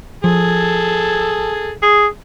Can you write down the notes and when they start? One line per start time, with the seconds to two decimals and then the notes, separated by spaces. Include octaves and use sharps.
0.24 F3 G#4 A4
1.82 G#4